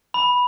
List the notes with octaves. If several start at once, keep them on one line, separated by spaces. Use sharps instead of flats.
B5